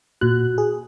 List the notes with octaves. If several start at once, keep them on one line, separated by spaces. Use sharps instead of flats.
A#2 F#4 F#6
G#4